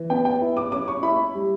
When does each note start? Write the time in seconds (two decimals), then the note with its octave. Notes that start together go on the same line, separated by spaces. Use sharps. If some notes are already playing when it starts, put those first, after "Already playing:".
Already playing: E3
0.10 B3 G5
0.25 G5
0.41 E4
0.57 D6
0.72 C#4 D6
0.88 C#6
1.02 E4 B5
1.35 G3